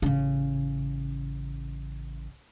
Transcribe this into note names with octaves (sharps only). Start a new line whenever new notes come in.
A1 C#3